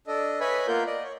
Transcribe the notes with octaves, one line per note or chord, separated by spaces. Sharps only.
D4 A4 D#5
B4 C#5 D#5 E5 G#5 B5
A#3 B3 F4 A#4 G6
D5 D#5
C#5